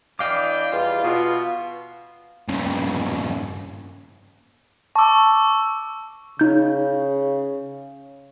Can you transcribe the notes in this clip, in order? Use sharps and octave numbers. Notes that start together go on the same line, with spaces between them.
E3 D4 D#5 F5 G5 D6
E2 G3 F4
B2 F4
G2 C#3
A5 C#6 D6 E6
C#3 D#4 G6